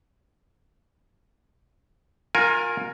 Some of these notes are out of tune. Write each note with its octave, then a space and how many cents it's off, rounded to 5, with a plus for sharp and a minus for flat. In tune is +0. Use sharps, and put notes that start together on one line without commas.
F4 +40 A#4 +0 G#5 +0